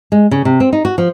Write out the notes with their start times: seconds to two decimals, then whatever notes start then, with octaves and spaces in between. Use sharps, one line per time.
0.12 G#3
0.31 C#3
0.45 C3
0.60 C4
0.73 D#4
0.85 F#4
0.98 F3